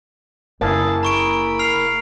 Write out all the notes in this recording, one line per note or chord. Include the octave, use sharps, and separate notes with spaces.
F#1 D3 A#3 E4 G#4 A5
A#5 B5 C#6 D7
F6 C7 F7